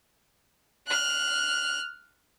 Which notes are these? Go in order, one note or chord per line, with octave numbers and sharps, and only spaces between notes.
F6 F#6